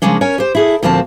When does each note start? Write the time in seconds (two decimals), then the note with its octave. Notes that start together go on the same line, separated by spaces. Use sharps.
0.02 C#3 F3 G#3 A#3 C#4 D4
0.21 C#4 A#4 C#5 G#5
0.38 G4 C5
0.55 E4 G#4 A4
0.83 D2 A#2 F3 A#3 C4 A5